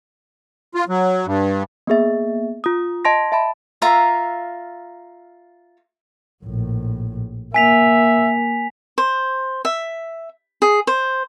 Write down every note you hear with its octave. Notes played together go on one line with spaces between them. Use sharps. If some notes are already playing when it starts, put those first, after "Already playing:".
F4
F#3
G2
A#3 B3 G#4 E5
F4 D#6
D#5 A5 C6 A#6
E5 A5 B5
F4 E5 F5 A#5
A#1 A2
A#3 E5 G#5 B6 F7
C5
E5
G#4
C5